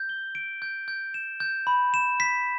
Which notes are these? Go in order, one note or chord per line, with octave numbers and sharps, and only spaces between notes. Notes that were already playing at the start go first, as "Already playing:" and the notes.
Already playing: G6
G7
D7
G6
G6
E7
G6
B5
E7
B6